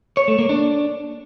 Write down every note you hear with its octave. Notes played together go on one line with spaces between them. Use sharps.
C#5
A3
A#3
D4